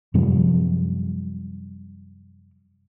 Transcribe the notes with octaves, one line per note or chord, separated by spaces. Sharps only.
F#2 C3 F3 G3